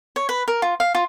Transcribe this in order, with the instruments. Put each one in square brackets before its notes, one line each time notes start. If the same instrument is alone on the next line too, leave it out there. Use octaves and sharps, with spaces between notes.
[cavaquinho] C#5
B4
A#4
F4
F5
F4